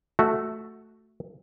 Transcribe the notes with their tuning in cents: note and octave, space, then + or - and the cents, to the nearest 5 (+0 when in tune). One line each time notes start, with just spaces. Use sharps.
A3 +0 F#4 +0